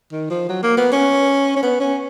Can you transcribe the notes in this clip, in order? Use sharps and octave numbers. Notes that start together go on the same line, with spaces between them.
D#3
F3
F#3
A#3
B3
C#4
C#4
B3
C#4